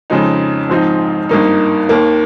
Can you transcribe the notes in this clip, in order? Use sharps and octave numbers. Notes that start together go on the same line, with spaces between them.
F2 C#3 F3 G#3 D#4
A#1 G#2 F3 C4 D#4
G#1 G2 D#3 A#3 D#4
D#2 D#3 A#3